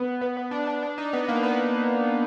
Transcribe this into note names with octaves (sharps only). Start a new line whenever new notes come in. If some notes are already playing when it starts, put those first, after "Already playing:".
Already playing: B3
B3
B3
D4
D4
D4
D#4
B3
A#3
B3